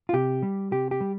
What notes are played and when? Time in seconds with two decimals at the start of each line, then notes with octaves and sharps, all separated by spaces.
0.09 F4
0.13 C3 G4
0.43 G3
0.71 C3 G4
0.91 G4
1.01 G3